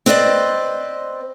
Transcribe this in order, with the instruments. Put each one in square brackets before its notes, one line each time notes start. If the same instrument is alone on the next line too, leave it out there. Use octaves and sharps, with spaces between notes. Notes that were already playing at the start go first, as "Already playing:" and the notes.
[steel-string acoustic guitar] C4 B4 C5 D5 D#5